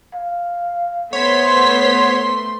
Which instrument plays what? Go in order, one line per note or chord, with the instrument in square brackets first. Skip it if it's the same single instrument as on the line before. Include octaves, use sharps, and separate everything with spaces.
[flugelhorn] F5
[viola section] A3 C6 [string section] B3 C5 B6 [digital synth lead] C#5 [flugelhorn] F#5